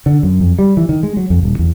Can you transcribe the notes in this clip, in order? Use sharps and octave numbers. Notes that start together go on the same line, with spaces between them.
D3
F#2
F2
G3
E3
D#3
G#3
F#3
F2
D#1
E2